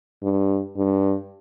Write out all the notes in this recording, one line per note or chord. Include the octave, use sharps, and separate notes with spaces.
G2
G2